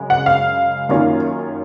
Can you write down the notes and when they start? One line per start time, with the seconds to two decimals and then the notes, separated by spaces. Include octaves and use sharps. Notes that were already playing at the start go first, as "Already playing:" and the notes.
Already playing: F#2 C#3 G#3
0.10 F#5
0.26 F5
0.89 F#2 D#3 A#3 C#4 F4